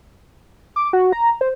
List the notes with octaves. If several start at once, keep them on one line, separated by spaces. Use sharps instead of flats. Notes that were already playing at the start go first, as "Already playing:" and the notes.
D6
F#4
A#5
C5